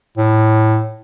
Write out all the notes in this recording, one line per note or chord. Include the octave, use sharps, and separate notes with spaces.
A2